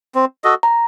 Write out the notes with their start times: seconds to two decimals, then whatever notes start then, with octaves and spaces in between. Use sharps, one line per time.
0.15 C4
0.44 F#4 A4 D#5
0.63 A#5